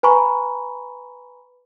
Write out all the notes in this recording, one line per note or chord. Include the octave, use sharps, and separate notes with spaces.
B4 G#5 A#5 B5 C#6